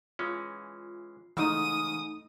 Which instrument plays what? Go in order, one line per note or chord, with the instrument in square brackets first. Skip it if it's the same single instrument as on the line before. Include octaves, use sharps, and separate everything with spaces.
[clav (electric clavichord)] E3 G#3 C#4 [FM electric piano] F4
[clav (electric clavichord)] G#2 C#3 [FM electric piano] E3 [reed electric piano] A3 D#4 E6 [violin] D#6